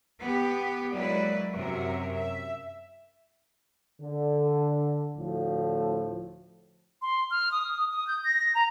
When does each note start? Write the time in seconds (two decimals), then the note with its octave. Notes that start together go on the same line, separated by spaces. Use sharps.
0.20 B3 G4
0.93 F#3 G#3 A#3 E4 B4 D5
1.54 F#2 C3 F#3 A#4 E5
2.12 E5
4.01 D3
5.17 D2 A2 F3
7.02 C6
7.31 F6
7.52 D#6
7.91 D#6
8.07 G6
8.24 A#6
8.55 A#5